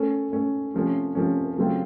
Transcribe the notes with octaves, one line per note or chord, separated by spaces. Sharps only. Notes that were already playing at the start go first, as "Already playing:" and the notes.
Already playing: A3 C#4 A4
A3 C#4 A4
C3 F3 A3 C#4
C3 F3 A3 C#4
C#3 F#3 A3 C4 F4